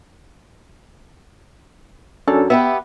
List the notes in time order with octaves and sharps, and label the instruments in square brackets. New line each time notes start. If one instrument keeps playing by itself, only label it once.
[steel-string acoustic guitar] F#2 [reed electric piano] C#4 D4 A4
[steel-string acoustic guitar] B3 G4 B4 [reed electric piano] E5